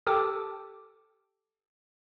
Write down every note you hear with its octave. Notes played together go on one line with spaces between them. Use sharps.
G4 A4 G5 D6 E6